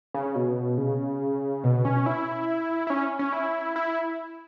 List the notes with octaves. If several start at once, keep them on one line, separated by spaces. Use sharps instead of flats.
C#3
B2
C#3
B2
C#4
E4
E4
C#4
C#4
E4
E4